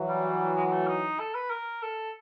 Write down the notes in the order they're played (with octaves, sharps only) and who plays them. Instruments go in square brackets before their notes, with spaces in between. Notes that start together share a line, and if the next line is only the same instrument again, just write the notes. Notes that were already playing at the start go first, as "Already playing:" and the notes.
Already playing: [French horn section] E3 F#3
[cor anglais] G3
G#3
G#3
A3
D#4
A4
B4
A#4
A4